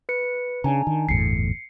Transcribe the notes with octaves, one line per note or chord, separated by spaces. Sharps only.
B4 C#7
C#3 D4 G#5 A#5
D#3
G1 E2 A2 C7 C#7